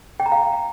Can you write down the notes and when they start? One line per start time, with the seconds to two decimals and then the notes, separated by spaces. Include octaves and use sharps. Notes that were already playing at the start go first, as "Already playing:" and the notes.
0.20 G5
0.26 A#5
0.32 F5